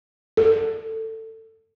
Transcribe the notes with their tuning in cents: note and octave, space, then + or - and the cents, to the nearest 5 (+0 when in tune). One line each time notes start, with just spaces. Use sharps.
A4 +20